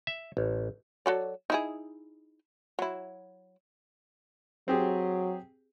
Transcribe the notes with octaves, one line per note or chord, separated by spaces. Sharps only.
E5
A1
F#3 A4 D5
D#4 E4 G#4
F#3 E4
F#3 C4 G4 G#4